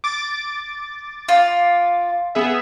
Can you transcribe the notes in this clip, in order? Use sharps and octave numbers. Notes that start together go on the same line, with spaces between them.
D6 A6
F4
B3 G#4 E5